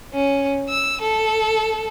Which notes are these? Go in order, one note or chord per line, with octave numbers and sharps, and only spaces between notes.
C#4
E6
A4